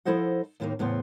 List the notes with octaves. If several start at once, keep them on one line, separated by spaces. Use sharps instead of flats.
F3 E4 A4 C5 D#5 F#5
D#2 A2 D#3 A3 A#3
E2 A2 C#3 B3 C5